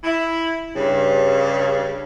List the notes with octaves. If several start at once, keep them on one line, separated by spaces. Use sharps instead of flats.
E4
G2 C#3